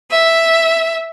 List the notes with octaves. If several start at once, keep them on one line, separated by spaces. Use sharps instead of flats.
E5